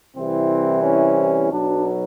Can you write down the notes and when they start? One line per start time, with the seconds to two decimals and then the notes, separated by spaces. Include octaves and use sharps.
0.15 C2 C3 E3 C4
0.83 C#4
1.51 B1 B2 F#3 D4